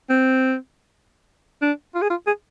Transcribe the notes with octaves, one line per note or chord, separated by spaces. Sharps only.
C4
D4
F4
G#4
F4
G#4